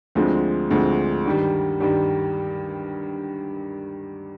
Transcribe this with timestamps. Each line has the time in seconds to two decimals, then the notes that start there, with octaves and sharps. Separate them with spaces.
0.15 D2 D3 F3 G#3 C4
0.70 D2 D3 F3 G#3 C4
1.25 G2 D#3 G3
1.80 G2 D#3 G3